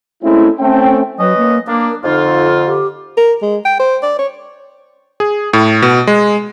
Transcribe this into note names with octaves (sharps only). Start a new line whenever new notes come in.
G#3 A3 C4 C#4 E4
A3 C4 C#4 G5
F#3 C#4 B4 D#5
A#3
A#3 D4 A#4
F2 D3 D#4 F4
G4
A#4
G#3
G5
C5
D5
C#5
G#4
A2
B2
G#3